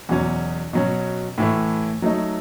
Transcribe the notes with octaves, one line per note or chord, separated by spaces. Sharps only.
E2 B2 F#3 C#4
B2 F#3 C#4
A2 E3 A3
F#3 A3 D#4